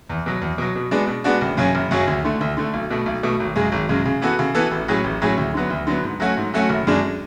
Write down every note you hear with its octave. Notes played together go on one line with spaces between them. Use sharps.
E2
B2 F#3
E2
B2 F#3
B2
G#3 B3 D4 F#4
B2
G#3 B3 D4 F#4
F#1
F#2 C#3 F#3 C#4
F#1
F#2 C#3 F#3 C#4
D2
D3 A3
D2
D3 A3
B1
B2 A3
B1
B2 A3
G#1
F#2 C#3 G#3
G#1
F#2 C#3 G#3
C#3
E3 B3 F#4 A4
C#3
E3 B3 F#4 A4
A1
A2 F#3 C#4 G#4
A1
A2 F#3 C#4 G#4
D2
D3 F#3 B3
D2
D3 F#3 B3
G#2
F#3 A3 C#4 F#4
G#2
F#3 A3 C#4 F#4
F#1
F#2 D3 G#3 D4